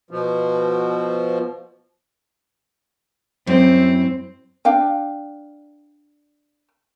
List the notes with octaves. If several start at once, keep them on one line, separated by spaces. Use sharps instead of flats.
B2 F3
F#2 C4 E4
D4 F5 G5